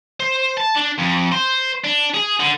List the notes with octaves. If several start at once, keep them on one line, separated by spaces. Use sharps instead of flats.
C5
A5
D4
F2
C5
D4
G#4
D3